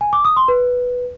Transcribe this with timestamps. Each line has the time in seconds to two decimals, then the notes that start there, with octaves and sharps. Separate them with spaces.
0.01 G#5
0.13 D6
0.25 D#6
0.36 C6
0.48 B4